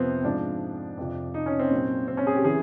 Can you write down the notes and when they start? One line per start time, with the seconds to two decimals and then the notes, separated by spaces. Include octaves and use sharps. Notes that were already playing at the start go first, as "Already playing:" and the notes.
Already playing: F2 C3 F3 B3 C4
0.24 G#2 F3 D4
0.97 F2 C3 F3
1.34 D#4
1.46 C#4
1.59 C4
1.71 A#2 F#3
2.08 C4
2.17 C#4
2.27 G#4
2.35 G4
2.44 E3 G#4